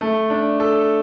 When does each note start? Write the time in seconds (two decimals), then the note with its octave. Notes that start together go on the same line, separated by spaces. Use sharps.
0.01 A3
0.30 D4
0.60 A4